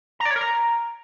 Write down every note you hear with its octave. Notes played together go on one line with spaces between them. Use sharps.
A#5
D5
C#5
A#4
A#5